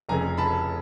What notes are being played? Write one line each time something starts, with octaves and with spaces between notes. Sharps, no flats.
F1 F2 C#3 G#5 A#5
A5 B5